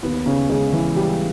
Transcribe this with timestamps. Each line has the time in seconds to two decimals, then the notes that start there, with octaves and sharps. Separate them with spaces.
0.03 D#2 B3
0.26 C#3 C#4
0.50 C#3 G#3 C#4
0.72 E3 E4
0.95 G3 G#3 G4